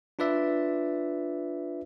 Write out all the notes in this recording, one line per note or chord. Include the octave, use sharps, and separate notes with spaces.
D4 F4 B4 D5 E5